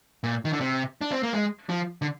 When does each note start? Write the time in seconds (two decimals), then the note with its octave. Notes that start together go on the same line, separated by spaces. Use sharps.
0.24 A#2
0.45 D#3
0.53 D3
0.61 C3
1.01 D4
1.12 C4
1.23 A#3
1.34 G#3
1.69 F3
2.02 D3